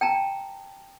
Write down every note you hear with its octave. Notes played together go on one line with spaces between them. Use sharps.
G5 A5 A#5